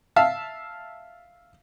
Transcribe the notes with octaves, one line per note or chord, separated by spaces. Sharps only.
E5 F5 A5